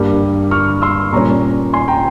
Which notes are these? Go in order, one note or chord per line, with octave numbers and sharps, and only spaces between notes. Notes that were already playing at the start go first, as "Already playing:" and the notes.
Already playing: G2 G3 A#3
C#6 F6
C6 E6
A#2 G3 C#4 A#5 C#6
G#5 C6
G5 A#5